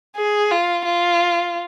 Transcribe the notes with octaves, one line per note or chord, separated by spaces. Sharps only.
G#4
F4
F4